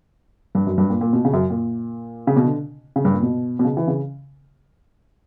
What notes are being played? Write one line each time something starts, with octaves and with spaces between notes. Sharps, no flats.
G2
F#2
G2
A#2
A#2
B2
C#3
F#2
A#2
C#3
B2
D3
C#3
G2
A#2
B2
B2
C#3
E3
C#3